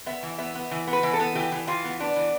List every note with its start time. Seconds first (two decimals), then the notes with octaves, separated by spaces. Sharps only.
0.06 B3 E5
0.23 E3
0.38 B3 E5
0.55 B3
0.71 E3
0.87 B3
0.93 B4
1.03 E3
1.13 A4
1.20 B3
1.35 E3 G4
1.52 E3
1.67 E3 F4
1.84 B3
2.00 B3 D4
2.16 E3